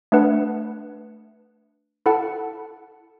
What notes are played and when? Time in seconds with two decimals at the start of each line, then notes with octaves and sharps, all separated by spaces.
0.12 A3 D4 B4 F#5
2.06 E4 A4 F#5 A5